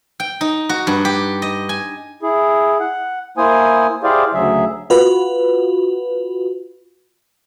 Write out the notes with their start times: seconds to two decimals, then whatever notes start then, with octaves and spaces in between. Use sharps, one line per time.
0.20 G5
0.41 D#4
0.69 F#4
0.87 G2
1.05 G4
1.42 D#5
1.69 G#5
2.23 E4 G#4
2.80 F#5
3.38 A#3 E4 C5 G#5 D#6
4.03 E4 G4 G#4 C5 D5 F5
4.33 D2 C#3 F#3 G#4 E5
4.90 F4 F#4 B4